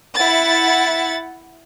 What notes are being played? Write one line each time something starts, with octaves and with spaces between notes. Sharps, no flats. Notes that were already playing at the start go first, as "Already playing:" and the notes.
E4 F#5 A6